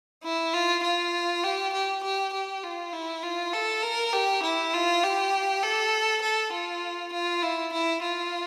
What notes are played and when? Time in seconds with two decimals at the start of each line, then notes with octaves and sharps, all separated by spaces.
0.24 E4
0.54 F4
0.83 F4
1.44 G4
1.74 G4
2.04 G4
2.33 G4
2.63 F4
2.93 E4
3.23 F4
3.53 A4
3.83 A#4
4.13 G4
4.43 E4
4.73 F4
5.03 G4
5.63 A4
6.22 A4
6.52 F4
7.13 F4
7.43 E4
7.73 E4
8.02 F4